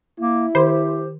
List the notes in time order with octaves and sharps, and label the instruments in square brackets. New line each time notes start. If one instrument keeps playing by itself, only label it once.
[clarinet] A#3 [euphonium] E4
[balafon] D#3 [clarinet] G4 [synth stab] C5